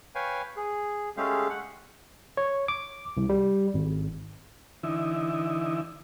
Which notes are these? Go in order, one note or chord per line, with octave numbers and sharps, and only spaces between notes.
B4 C#5 F5 G5 G#5
G#4
G#3 A3 C#4 G4 G#4 F5
F#5
C#5
D6
C2
G3
G#1
D3 E3 D#4 E4